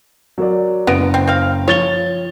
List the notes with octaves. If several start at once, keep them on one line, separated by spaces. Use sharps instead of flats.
F#3 A#4 D5
F#1 B3 A#6 D7
C4
C4 F5
F3 C#5 A6 G7